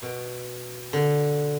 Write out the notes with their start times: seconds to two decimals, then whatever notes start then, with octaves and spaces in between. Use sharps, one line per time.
0.02 B2
0.93 D3